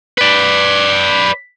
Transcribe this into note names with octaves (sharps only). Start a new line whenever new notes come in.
B4 D5